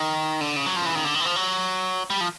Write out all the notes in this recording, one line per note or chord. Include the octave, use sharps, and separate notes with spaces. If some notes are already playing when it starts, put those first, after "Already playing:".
Already playing: D#3
D3
C#3
F#3
F3
E3
D#3
D3
D#3
E3
F3
F#3
G3
F3